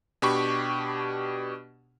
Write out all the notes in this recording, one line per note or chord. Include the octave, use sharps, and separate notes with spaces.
B2 D4 G4 B5 C#6